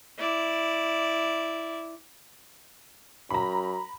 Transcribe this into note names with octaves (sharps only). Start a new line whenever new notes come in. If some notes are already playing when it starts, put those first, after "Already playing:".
E4 D5
F#2 A#5 B5